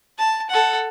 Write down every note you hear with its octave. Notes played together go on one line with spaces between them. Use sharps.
A5
A4 F#5